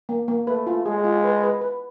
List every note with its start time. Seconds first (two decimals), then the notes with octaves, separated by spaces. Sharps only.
0.09 A#3
0.28 A#3
0.47 A3 B4
0.67 F4
0.86 G#3 G#4
1.04 F4
1.24 B4
1.43 B4
1.61 B4